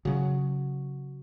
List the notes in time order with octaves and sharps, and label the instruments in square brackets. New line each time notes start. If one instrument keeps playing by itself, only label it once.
[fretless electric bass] C#3 F#3 [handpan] F#4